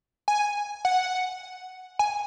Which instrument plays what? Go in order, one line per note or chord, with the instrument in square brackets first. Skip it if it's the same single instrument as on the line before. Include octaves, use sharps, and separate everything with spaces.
[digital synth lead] G#5
F#5
G#5